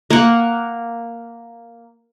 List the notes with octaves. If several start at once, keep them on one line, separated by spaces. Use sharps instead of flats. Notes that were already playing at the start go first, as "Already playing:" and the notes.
A#3 F#5